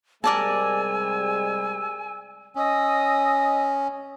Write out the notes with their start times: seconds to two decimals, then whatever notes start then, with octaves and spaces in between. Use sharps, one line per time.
0.24 C3 G3 G#3 A#4 D5 G#5 A5 E6
2.56 C#4 D#5 D#6 E6